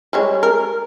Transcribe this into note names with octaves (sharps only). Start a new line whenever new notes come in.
G3 G#3 C#5
A#4